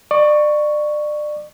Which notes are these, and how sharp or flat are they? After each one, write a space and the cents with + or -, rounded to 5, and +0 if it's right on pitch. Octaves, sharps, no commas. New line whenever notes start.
D5 +30 C#6 +0